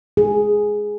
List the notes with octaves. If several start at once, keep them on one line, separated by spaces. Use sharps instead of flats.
G#4